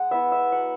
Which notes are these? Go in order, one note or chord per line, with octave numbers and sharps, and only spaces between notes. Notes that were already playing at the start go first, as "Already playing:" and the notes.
Already playing: G#3 F#5
B3 E4 E5
E5
F#3 F#5